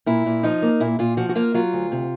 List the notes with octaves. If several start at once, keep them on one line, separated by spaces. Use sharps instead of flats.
A#2 E4
A#2
F3 D#4
A#3
A#2 E4
A#2 F4
F3 F#4
F#4
A#3 F4
F#3 F4
D2
C3